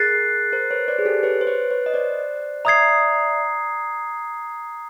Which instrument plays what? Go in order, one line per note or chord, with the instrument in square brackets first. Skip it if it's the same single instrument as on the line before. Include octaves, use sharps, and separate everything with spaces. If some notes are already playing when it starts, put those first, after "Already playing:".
Already playing: [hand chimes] G#4 A#4 [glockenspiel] F#6 A6 C7
[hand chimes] A#4 C5
B4 C#5
C5 D5
G#4
G4 A4
B4 C#5
C5
B4 C#5
B4 C#5
D#5
C5 D5
[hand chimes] D5 E5 [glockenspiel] A#5 D#6 G#6 C7